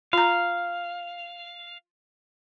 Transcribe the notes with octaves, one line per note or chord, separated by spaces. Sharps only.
F4 F5 A#5